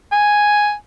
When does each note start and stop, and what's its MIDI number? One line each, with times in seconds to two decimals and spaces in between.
0.12 0.74 80